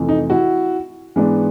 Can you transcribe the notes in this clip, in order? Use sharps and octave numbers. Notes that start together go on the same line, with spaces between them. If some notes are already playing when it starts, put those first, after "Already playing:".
Already playing: F2 C3 E3 A3
D#4
E4 F#4
G#2 E3 G#3 B3 D4